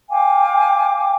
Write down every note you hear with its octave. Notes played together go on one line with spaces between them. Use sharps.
F5 G5 G#5 D6